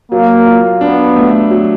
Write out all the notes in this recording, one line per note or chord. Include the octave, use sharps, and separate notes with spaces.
F#3 A#3
F4
B3 D4
A3
F#3